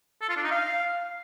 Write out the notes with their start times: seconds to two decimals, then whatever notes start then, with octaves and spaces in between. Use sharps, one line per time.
0.21 A4
0.29 F4
0.36 D4
0.44 D#4
0.51 F5